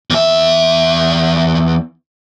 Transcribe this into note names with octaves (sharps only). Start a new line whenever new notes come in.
E2 E5